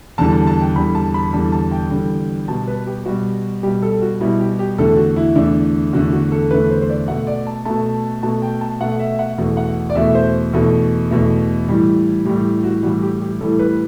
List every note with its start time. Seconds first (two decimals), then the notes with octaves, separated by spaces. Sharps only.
0.18 E2 D3 G3 A5
0.33 A5
0.47 A5
0.61 G5
0.76 E2 D3 G3 B5
0.95 A5
1.14 B5
1.33 E2 D3 G3 A5
1.52 A5
1.71 G5
1.91 E2 D3 G3
2.48 B2 G3 A5
2.67 B4
2.87 G4
3.06 B2 G3 F#4
3.63 B2 G3 G4
3.82 A4
4.02 F#4
4.21 B2 G3 E4
4.40 G4
4.59 G4
4.78 E2 D3 A3 A4
4.97 F#4
5.16 E4
5.35 E2 D3 A3 D4
5.93 E2 D3 A3 F#4
6.12 F#4
6.32 A4
6.50 E2 D3 A3 B4
6.70 C5
6.82 C5
6.89 D5
7.08 B2 A3 F#5
7.27 D5
7.47 A5
7.65 B2 A3 A5
8.23 B2 A3 A5
8.42 G5
8.61 A5
8.80 B2 A3 F#5
9.00 E5
9.19 F#5
9.38 E2 B2 A3
9.57 F#5
9.90 D5
9.95 E2 B2 A3 E5
10.15 C5
10.53 E2 B2 A3 A4
11.11 E2 B2 A3
11.68 A2 E3 G3
12.25 A2 E3 G3 G4
12.64 F#4
12.83 A2 E3 G3 F#4
13.02 G4
13.22 G4
13.41 A2 E3 G3 A4
13.59 B4